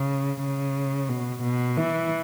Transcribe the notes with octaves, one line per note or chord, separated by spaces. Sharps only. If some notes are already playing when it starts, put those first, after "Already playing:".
Already playing: C#3
C#3
B2
B2
E3